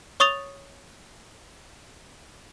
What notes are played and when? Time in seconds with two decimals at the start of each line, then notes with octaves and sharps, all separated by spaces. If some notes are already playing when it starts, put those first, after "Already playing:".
0.20 C#5 C#6 D#6 A6 F7